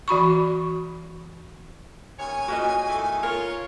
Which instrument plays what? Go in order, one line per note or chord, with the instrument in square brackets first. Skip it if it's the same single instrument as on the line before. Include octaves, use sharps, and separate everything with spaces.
[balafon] E3 F#4 B5 C#6
[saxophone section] D#2 C#3 C#5 [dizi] G#5
[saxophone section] A#2 C#3 [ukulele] F#4 B4 D#5
[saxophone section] E2 D#3 A3
[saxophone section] F4 C#5 [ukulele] A#4